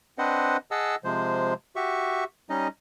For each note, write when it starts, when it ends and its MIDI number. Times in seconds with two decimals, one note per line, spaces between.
0.18 0.57 60
0.18 0.57 62
0.18 0.57 71
0.18 0.57 72
0.18 0.57 75
0.18 0.57 78
0.71 0.95 68
0.71 0.95 75
0.71 0.95 78
0.71 0.95 81
0.71 0.95 88
1.04 1.54 48
1.04 1.54 53
1.04 1.54 56
1.04 1.54 72
1.76 2.24 66
1.76 2.24 67
1.76 2.24 76
1.76 2.24 85
2.50 2.68 55
2.50 2.68 61
2.50 2.68 63
2.50 2.68 75